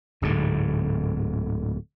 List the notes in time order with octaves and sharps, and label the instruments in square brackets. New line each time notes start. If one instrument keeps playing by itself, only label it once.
[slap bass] D1 G#2 D3